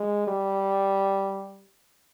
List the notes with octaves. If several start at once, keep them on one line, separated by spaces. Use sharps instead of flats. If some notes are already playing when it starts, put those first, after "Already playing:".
Already playing: G#3
G3